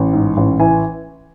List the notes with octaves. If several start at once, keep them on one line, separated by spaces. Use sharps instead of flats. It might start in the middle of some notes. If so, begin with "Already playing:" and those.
Already playing: A1
G#2
A1
E3 G#5